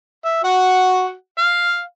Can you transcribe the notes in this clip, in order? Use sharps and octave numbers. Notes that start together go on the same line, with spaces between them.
E5
F#4 F#5
F5